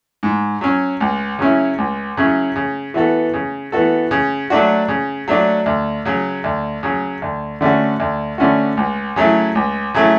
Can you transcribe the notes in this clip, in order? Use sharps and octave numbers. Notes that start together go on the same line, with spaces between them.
G#2
F#3 C#4
C#2
C#3 F#3 C#4 E4
C#2
C#3 F#3 C#4 E4
C#3
E3 B3 F#4 A4
C#3
E3 B3 F#4 A4
C#3
F#3 A3 D4 F#4
C#3
F#3 A3 D4 F#4
D2
C#3 F#3
D2
C#3 F#3
D2
D3 A3 C#4 F#4
D2
D3 A3 C#4 F#4
C#2
C#3 F#3 A3 E4
C#2
C#3 F#3 A3 E4